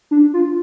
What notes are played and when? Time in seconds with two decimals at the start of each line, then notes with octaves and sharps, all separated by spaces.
0.11 D4
0.34 F4